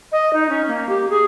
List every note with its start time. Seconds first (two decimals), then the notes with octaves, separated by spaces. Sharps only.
0.12 D#5
0.33 D#4
0.49 C#4
0.67 A#3
0.88 G4
1.10 G#4